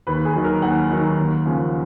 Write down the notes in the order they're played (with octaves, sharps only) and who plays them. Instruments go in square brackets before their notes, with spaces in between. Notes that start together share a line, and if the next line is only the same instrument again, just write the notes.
[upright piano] D#2 B4
G#4
D#3 F#3
A#4
D#2 F#5
D#3 F#3
D#2
C#3 F3